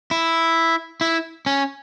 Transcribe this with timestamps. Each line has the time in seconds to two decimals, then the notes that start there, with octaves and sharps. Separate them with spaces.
0.11 E4
1.01 E4
1.46 C#4